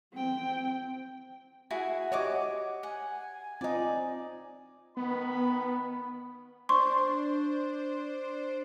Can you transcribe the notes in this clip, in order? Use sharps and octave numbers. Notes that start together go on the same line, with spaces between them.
C4 G5
E4 F#4 G#4 F#5
F#4 G4 C#5 D#5 D6
F#5 G#5
C4 D#4 F4 D5 D#5
D#3 B3 B5
D4 C5 C6 C#6